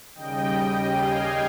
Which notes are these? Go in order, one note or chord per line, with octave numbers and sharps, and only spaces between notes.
D#2 C#3 G3 D#5 G5
D#5 G5
F5 G#5